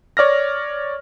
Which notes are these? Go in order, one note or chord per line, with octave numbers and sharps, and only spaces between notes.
C#5 D5 F6 A#6